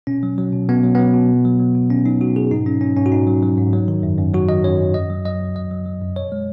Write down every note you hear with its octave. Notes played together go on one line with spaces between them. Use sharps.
B2 C#4
F#3
F#3
B2
B2 B3
F#3
F#3 B3
B2
B2
F#3
F#3
B2
B2 C#4
F#3 D#4
F#3 F#4
B2 G#4
G#2 D#4
F#3 C#4
F#3 C#4
G#2 C#4
F#4
G#2 D#4
F#3
F#3
G#2
F#3
D#3
F#2
F#2
F#3 F#4
D#3 D#5
F#2 C#5
F#2
F#2 D#5
F#3
F#3 D#5
F#2
F#2 D#5
F#3
F#3
F#2
B2 C#5
G#3